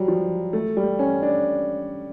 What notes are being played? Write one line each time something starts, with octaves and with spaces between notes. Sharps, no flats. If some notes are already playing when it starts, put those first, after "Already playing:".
Already playing: F#3 G3
F3
A3
G3
C#4
D4